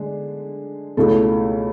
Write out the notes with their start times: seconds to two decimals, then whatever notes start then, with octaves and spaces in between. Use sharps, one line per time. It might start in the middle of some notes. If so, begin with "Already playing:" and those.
Already playing: D3 G#3 D4
0.97 C#2 B2 A3 E4 A4